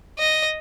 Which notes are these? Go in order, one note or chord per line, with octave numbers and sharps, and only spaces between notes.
D#5